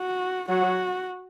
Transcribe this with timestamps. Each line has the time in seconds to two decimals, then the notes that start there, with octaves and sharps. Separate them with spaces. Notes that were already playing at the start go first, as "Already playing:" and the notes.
Already playing: F#4
0.49 F#3 F#4